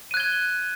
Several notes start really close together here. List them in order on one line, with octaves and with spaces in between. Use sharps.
D#7 F#6 G#6 G7